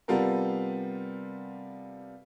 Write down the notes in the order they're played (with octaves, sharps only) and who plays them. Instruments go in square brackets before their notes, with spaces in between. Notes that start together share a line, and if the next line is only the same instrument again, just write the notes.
[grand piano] C3 G3 B3 F4 A4 A#4